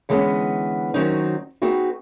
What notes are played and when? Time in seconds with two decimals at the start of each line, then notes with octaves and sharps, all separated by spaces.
0.09 D3 E3 G#3 B3 C#4
0.94 D#3 F#3 C4 C#4 D#4
1.62 B3 C4 D#4 F#4 G#4